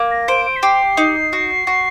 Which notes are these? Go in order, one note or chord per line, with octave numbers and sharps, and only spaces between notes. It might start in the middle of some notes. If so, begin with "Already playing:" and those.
Already playing: A#3
A#6
C5 D7
D7
B6
G4 C7
D#4
F#4
F#4